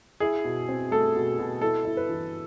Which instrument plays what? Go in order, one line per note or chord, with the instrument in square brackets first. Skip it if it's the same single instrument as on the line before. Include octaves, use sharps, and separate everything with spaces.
[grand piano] E4 G#4
B2
C4
A3 A4
B2
B2
E4 A4
E4
B4
E3